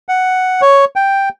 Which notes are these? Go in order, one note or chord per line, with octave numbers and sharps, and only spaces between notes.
F#5
C#5
G5